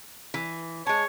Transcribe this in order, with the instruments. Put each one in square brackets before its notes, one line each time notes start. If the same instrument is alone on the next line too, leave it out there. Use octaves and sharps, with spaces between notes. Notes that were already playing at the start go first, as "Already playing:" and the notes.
[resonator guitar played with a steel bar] E3
[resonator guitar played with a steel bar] G#3 A5 [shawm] C#5